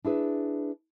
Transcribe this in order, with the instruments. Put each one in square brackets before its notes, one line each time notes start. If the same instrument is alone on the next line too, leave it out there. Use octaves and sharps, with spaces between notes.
[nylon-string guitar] D4 E4 G#4 B4